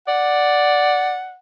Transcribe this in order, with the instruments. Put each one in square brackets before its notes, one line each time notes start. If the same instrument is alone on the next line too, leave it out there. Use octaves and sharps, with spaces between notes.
[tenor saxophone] D5 [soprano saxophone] F#5